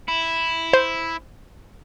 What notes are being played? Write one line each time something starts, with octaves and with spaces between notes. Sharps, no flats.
E4
C5